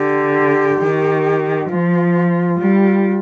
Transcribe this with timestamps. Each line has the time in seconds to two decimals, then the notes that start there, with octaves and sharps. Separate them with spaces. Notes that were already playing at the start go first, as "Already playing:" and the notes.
Already playing: D3 G4
0.79 D#3
1.68 F3 F4
2.58 G3